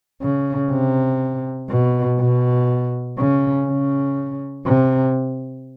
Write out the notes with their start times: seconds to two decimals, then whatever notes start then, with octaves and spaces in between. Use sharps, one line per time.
0.22 C#3
0.71 C3
1.70 B2
2.19 B2
3.18 C#3
3.68 C#3
4.66 C3